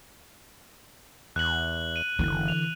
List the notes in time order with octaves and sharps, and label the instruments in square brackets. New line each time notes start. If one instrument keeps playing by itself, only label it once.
[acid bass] E2 [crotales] F#6 F#7
[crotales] D#7 F#7
[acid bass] F#1 [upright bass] D3 E3
[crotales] F7